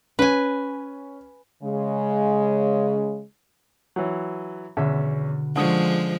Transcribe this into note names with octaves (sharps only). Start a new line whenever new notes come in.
C#4 B4 G#5
C#3 G#3
E3 F#3
E2 B2 D3 B3 C#4 E5
D3 F3 G#3 C#4 D#6